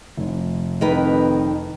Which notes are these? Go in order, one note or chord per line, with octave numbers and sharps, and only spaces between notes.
F1
F2 D#3 D#4 B4